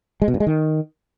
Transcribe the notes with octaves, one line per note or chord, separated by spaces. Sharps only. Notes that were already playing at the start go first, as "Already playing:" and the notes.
G#3
B2
G2
G#3
D#3